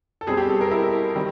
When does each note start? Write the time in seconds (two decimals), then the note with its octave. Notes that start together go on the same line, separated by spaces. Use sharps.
0.21 A4
0.27 B2 G3 C4 G#4
0.37 G4
0.49 A4
0.61 A#4
0.71 E4
1.15 D#3 G3 C4